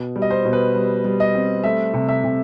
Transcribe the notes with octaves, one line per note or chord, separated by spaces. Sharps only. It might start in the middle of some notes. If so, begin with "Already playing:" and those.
Already playing: B2
G3
D#5
C5
B2
B4
G3
G3
D#5
C4
A3 E5
C3
E5
C3